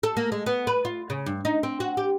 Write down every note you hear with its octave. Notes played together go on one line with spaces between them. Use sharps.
A4
A#3
G#3
B3
B4
F4
C#3
G2
D#4
C4
F#4
G4